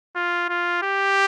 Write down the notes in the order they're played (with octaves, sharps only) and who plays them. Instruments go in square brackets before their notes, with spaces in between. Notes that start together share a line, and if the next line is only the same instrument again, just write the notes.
[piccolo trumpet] F4
F4
G4